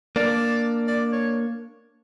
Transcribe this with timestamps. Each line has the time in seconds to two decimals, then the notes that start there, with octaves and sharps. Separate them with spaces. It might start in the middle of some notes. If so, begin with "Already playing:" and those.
0.16 A#3 D4 D5
0.88 D5
1.13 C#5